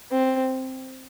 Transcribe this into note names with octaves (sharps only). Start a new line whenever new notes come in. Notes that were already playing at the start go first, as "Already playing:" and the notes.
C4